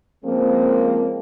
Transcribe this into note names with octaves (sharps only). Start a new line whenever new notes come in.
C#3 F3 G#3 A#3 C4